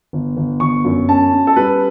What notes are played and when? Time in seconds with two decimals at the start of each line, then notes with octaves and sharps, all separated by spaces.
0.13 G1
0.37 G1
0.60 G1 C#6
0.85 F#2
1.09 C#4 A5
1.33 C#4
1.47 A4
1.56 G3 B4